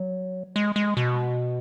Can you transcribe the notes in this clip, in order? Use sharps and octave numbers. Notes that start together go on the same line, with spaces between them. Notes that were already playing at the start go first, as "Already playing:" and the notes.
Already playing: F#3
G#3
G#3
B2